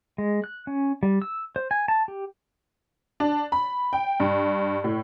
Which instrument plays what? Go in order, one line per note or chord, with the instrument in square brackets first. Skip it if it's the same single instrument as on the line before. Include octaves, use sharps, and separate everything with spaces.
[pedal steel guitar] G#3
F#6
C#4
G3
E6
C5
G#5
A5
G4
[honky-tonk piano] D4
B5
G5
G2
A2